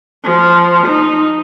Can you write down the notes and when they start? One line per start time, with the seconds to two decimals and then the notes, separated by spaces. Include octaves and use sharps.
0.24 F3
0.87 D#4